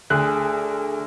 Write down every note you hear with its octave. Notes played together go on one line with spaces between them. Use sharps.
D2 G#4 A4 F#6